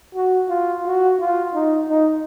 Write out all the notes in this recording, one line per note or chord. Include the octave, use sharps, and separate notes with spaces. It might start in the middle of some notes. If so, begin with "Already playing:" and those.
F#4
F4
F#4
F4
D#4
D#4